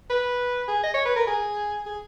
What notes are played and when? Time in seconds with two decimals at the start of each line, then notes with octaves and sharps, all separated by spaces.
0.10 B4
0.68 G#4
0.84 D#5
0.94 C#5
1.06 B4
1.16 A#4
1.27 G#4
1.86 G#4